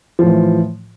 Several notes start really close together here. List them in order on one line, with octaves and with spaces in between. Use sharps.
F3 A2 E3